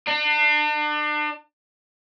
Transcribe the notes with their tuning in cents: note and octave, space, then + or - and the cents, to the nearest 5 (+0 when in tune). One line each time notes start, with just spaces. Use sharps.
D4 +35